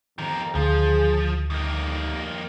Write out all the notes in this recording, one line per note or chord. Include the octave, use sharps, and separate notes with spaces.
F2 D#3 G4 A#4 A#5
D2 F3 G#4
F2 G3 A3 A#3 D#4